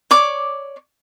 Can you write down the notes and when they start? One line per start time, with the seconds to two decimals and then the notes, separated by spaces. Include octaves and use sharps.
0.11 C#5 D5 D6